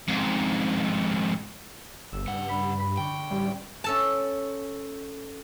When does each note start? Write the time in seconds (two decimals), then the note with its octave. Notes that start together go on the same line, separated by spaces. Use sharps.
0.08 F2 G#2
2.13 G1 E6
2.27 G2 C#3 F#5
2.49 B5
2.79 B5
2.98 D3 D5 G5 C#6
3.31 A1 G3
3.84 C#4 A4 A5